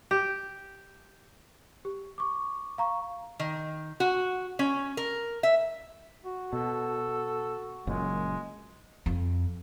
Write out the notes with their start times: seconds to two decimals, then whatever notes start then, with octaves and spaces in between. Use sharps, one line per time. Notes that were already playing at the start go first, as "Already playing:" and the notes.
0.11 G4
1.85 G4
2.18 C#6 D6
2.78 F5 A#5 C#6
3.40 D#3
4.00 F#4
4.59 C#4
4.97 A#4
5.43 E5
6.25 F#4
6.53 B2 A4
7.87 F#1 F#2 A#2 G#3
9.06 F2